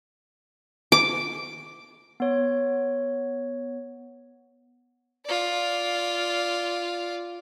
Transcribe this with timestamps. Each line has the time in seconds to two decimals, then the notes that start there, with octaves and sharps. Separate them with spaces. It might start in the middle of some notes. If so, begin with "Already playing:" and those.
0.92 D6
2.20 B3 C#5
5.26 F4 D5